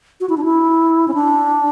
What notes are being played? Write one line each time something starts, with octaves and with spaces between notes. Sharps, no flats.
F#4
E4
D4
E4
C#4
D4